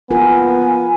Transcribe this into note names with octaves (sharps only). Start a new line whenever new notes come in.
B3 F4 A#4 G#5